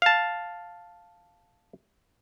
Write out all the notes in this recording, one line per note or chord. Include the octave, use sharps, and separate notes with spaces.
F5 A5